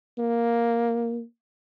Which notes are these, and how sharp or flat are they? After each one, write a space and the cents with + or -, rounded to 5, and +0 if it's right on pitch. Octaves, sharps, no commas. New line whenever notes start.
A#3 +5